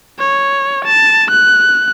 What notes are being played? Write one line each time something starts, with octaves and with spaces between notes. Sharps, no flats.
C#5
A5
F#6